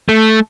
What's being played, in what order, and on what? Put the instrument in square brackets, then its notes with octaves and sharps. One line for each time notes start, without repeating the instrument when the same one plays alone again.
[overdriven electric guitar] A3